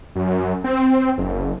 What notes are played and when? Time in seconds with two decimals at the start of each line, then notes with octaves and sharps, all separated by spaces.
0.16 F#2
0.64 C4
1.18 F#1